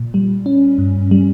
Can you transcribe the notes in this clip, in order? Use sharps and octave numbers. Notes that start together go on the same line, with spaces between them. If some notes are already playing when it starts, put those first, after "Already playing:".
Already playing: A#2
G3
C#4
G2
G3